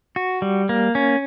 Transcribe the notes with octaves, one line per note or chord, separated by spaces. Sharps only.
F#4
G3
A#3
C#4